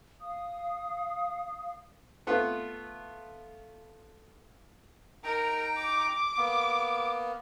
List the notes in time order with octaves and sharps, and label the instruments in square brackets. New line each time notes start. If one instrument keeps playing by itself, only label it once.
[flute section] F5 D#6
[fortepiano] A3 B3 F4
[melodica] D#4 G5 A#5 [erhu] A#4
[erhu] D6
[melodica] A#3 B3